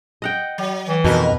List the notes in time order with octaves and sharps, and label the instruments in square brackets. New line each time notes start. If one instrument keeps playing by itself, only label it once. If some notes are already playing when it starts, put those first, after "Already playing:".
[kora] D#5 F#5 G5
[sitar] F#3
[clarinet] E3
[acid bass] F2 [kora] B2 B4 [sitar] D#4 A#4